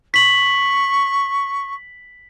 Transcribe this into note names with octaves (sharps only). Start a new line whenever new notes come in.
C#6 B6 F#7